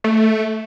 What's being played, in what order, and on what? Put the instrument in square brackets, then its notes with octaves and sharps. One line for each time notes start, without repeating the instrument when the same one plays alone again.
[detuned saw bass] A3